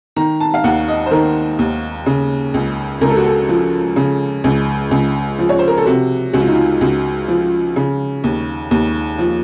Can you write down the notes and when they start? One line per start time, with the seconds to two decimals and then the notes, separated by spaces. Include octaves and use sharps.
0.16 D#3 A#5
0.40 A5
0.54 F5
0.64 D#2 F#5
0.88 D#5
1.06 C5
1.11 D#3 A#4
1.59 D#2
2.06 C#3
2.54 C#2
3.01 C#2 A#4
3.09 A4
3.17 F#4
3.25 A4
3.49 F3
3.96 C#3
4.44 C#2
4.91 C#2
5.39 F3
5.49 C#5
5.59 C5
5.68 A#4
5.77 A4
5.86 C3 F#4
6.33 C#2 F#4
6.40 F4
6.48 D#4
6.55 F4
6.81 C#2 F#4
7.28 F3
7.76 C#3
8.24 D#2
8.71 D#2
9.19 F3